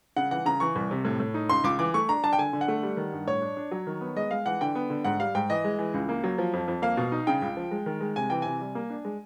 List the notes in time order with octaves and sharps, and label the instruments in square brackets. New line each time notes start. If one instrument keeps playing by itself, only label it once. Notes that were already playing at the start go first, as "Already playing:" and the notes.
[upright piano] C#3 F#5
E3 F#5
C#3 A#5
E3 C#6
C2
C3
A2
A2
D#4
C#2 C6
C#2 D6
E3 D6
A3 C#6
D4 A#5
D4 A5
G5
D3 G#5
D3
F#5
A3
G3
D#3
G2
A2 C#5
D4
D4
F#3
D#3
B3
G#3 D#5
G#3 F5
E3 F#5
D3 G5
B3
D3
G#2 F#5
G3 F5
G#2 G5
E3 D#5
G#3
E3
C#2
A#3
F#3
F3
F2
F2
A#3 F5
B2
D#4
C#3 G5
C#2
F3
G#3
D#3
G#3
C3 G#5
E3 G5
C3 G#5
G3
A#3
D4
G#3